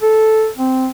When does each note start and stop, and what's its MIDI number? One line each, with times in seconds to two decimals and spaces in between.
0.02 0.48 69
0.58 0.88 60